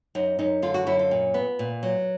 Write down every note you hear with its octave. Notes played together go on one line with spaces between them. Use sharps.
F#2 D#4
F#2 D#4
D3 F4
F#4
F#2 E4
F4
A#2
B3
A#2
F#3